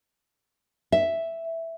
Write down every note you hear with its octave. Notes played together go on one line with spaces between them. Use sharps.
E5